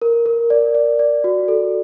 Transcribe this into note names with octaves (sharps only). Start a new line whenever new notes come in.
A#4
A#4
D5
D5
D5
F#4
A4